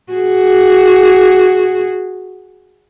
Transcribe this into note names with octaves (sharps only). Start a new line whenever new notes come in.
F#4 G#4